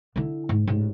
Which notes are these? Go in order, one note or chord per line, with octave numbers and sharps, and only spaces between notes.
D3 E4
G#2
A1 G#2